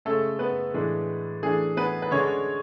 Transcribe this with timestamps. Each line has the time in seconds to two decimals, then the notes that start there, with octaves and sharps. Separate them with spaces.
0.05 C#3 G#3 A3 C#4 A4
0.39 B3 B4
0.74 A2 E3 G#3 B3 D4
1.43 E3 A3 D4 G#4
1.77 B3 B4
2.02 B4
2.11 D3 G#3 C#4 D4 C#5